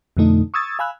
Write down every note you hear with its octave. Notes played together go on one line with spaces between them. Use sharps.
F2 B2 D3 A3 D#4
C#6 D#6 E6 G#6 A6
F5 G#5 B5 E6 F#6